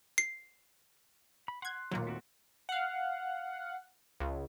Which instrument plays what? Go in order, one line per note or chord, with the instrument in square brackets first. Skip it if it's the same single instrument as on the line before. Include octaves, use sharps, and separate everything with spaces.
[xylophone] C7
[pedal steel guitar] B5
[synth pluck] F#5 G#6 [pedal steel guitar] C6 F#6
[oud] D#2 A#2 [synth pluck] F#3 A#3
[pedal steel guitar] A3 C4 F#4
[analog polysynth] F5 F#5
C#2